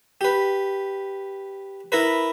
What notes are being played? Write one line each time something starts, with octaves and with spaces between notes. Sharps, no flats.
G4 B4
E4 A#4 B4